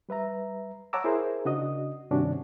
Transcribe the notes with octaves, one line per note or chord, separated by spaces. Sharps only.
G3 B4 E5 A#5
C#5 F#5 A5 A#5 D6 E6
E4 G#4 A#4 C5
C#3 D4 F#4 D#5 D#6
G2 C3 D#3 C#4 D4 F#4